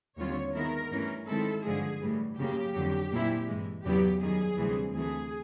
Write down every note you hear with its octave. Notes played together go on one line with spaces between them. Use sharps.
D#2 D3 G3 C4 F4 C#5
D#3 G#3 B3 E4 A#4
G2 E3 A3 C#4
D#3 G#3 C4 E4 A4
G2 D3 F3 G#3 G#4
A2 E3 G3
F#2 C#3 F3 A#3 G4
F2 D3 F#3
A#2 G3 C4 E4
G2 E3 G#3
E2 C#3 F#3 B3 E4 G4
F#2 D#3 G3 G#4
D2 C3 E3 G3 C4
D2 C3 E3 A3 G#4